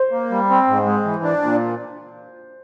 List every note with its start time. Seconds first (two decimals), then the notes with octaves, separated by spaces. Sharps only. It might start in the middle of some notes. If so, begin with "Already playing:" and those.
Already playing: C5
0.11 A#3
0.31 G3
0.50 C4
0.67 G#2
0.86 G#3
1.05 E3
1.24 D4
1.42 A#2